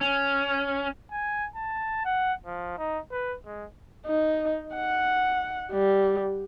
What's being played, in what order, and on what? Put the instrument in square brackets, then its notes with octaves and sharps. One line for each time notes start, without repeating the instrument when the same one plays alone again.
[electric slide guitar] C#4
[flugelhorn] G#5
A5
F#5
F3
D#4
B4
G#3
[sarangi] D#4
F#5
G3